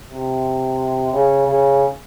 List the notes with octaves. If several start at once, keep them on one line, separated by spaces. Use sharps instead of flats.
C3
C#3
C#3